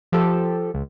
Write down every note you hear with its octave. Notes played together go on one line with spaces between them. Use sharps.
F3 G4 A4
C#2